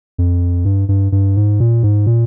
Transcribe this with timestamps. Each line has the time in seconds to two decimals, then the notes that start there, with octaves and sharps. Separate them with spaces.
0.18 F2
0.65 G2
0.89 G2
1.12 G2
1.37 G#2
1.60 A#2
1.83 G#2
2.06 A#2